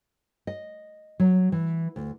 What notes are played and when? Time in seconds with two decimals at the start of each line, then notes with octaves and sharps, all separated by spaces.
0.47 D#5
1.20 F#3
1.52 E3
1.96 D2